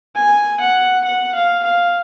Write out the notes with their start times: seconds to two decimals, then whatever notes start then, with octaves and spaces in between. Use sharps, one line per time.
0.16 G#5
0.60 F#5
1.05 F#5
1.35 F5
1.64 F5